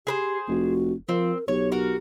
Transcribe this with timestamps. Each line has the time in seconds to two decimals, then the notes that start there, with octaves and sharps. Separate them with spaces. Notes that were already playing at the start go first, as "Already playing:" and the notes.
0.07 G4 G#4 B4 C5
0.49 F1 F#4
1.09 F3 C4 A#4
1.48 B1 G4 C#5
1.72 F#4 A#4